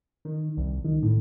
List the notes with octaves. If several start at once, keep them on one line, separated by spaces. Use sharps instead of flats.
D#3
C2
D#3
A2